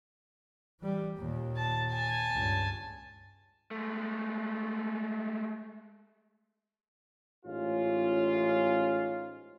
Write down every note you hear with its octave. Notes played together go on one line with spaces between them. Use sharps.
E3 G3
D#2 A#2
A5
G#5 A5
C#2 G2
G#3 A3
A1 G#2 C#4 F4